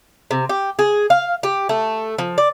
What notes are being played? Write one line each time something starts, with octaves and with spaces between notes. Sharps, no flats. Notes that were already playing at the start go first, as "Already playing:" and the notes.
C3
G4
G#4
F5
G4
A3
F3
D5